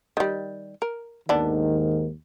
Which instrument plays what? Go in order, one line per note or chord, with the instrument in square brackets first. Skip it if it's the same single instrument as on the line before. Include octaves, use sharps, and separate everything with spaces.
[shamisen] D#3 G3
A#4
[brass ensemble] D#2 G#2 D#3 [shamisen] D3 B3 D4